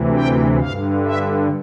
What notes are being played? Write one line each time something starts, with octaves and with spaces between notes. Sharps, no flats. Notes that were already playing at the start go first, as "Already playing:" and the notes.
Already playing: D2 C3 E3
G5
G2 D3 F5
E5